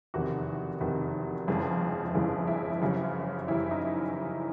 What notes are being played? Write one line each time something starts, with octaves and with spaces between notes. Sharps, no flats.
F1 E2 C3 D#3 F#4
F1 E2 C3 D#3
G1 F2 C#3 E3 G#3
G1 F2 C#3 E3 G#3 E4
E4
F#1 F#2 C#3 E3 G3
F#1 F#2 C#3 E3 G3 E4
D#4